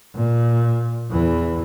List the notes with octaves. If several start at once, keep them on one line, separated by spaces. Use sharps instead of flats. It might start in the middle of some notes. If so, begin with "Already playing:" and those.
A#2
E2 E3